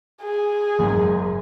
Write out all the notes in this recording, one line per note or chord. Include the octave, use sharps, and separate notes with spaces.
G#4
F#1 G#2